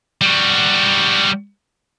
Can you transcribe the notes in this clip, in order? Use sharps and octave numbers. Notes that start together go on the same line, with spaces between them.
G3 F#4